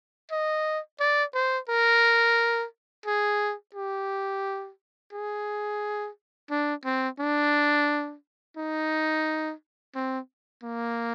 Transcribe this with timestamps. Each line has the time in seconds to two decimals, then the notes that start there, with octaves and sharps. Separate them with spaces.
0.31 D#5
1.00 D5
1.34 C5
1.69 A#4
3.06 G#4
3.75 G4
5.13 G#4
6.50 D4
6.85 C4
7.19 D4
8.57 D#4
9.95 C4
10.63 A#3